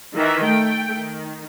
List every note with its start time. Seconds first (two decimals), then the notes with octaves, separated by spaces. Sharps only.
0.15 D#3 E3 E5
0.45 A3 G5
0.95 D#3